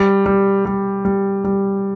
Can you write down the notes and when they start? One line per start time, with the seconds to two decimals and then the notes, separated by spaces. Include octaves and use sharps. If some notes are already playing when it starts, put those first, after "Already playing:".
Already playing: G3
0.26 G3
0.65 G3
1.05 G3
1.44 G3